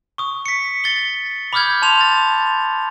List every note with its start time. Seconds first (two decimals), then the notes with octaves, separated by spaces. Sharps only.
0.18 C#6 D#6
0.46 B6 C#7
0.84 A6 G7
1.53 B5 D6 D#6 F6 G6 G#6
1.82 A5 C6 F7
2.01 A6